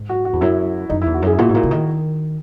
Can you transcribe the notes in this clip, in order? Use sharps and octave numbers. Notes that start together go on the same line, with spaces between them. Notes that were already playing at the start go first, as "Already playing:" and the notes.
Already playing: G#2
F#4
F#4
E2
F#2 E4
F#2 D#4
E4
E2
F#4
F#2 G#4
E4
A#2 F#4
G#2 E4
A#2
C#3
D#3 A#4